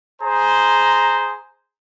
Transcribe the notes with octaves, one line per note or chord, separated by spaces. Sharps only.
G#4 C5 A#5